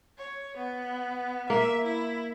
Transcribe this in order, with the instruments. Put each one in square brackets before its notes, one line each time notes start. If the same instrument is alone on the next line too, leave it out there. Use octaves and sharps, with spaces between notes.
[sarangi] C#5
B3
[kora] A#3 [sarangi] E5
[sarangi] E4